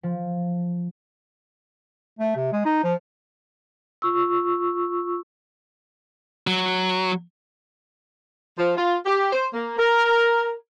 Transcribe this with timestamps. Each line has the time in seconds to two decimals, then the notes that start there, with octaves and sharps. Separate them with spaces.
0.03 F3
2.19 A3
2.36 C3
2.52 G#3
2.65 D#4
2.84 F3
4.02 F4 C#6 E6
6.47 F#3
8.58 F3
8.77 F4
9.06 G4
9.32 C5
9.53 A#3
9.78 A#4